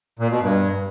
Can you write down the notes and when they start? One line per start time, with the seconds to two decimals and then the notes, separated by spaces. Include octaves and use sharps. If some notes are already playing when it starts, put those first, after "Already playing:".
0.19 A#2
0.30 B2
0.42 G2